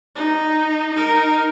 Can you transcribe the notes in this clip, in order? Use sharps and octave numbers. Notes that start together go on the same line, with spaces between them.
D#4
D#4 A#4